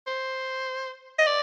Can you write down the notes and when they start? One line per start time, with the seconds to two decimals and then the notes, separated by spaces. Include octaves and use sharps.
0.07 C5
1.19 D#5
1.27 D5